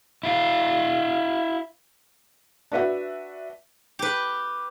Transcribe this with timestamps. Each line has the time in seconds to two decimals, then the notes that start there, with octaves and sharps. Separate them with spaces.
0.23 E4 F5
2.72 D4 F#4 B4 E5 F#5
3.99 G4 B4